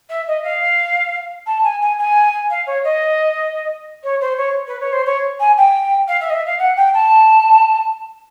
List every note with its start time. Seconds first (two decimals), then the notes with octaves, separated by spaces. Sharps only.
0.10 E5
0.27 D#5
0.44 F5
1.46 A5
1.64 G#5
1.81 G#5
1.98 G#5
2.50 F5
2.67 C#5
2.84 D#5
4.04 C#5
4.21 C5
4.37 C#5
4.67 B4
4.80 C#5
4.93 C5
5.06 C#5
5.40 G#5
5.57 G5
6.08 F5
6.21 E5
6.30 D#5
6.33 E5
6.46 F5
6.59 F#5
6.76 G5
6.94 A5